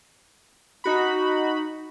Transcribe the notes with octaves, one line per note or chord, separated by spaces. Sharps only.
D#4 F#4 B5